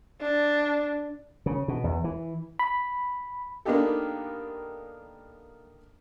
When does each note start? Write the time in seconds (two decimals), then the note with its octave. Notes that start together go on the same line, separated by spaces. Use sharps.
0.22 D4
1.46 C#3
1.68 B2
1.84 E2
2.04 E3
2.59 B5
3.65 A#3 B3 D4 D#4 G4 A4